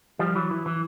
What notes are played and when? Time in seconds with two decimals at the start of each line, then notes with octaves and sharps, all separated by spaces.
0.19 F3 G3
0.35 E3 F#3
0.51 E3
0.66 E3